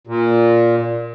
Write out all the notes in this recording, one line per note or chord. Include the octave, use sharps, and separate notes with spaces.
A#2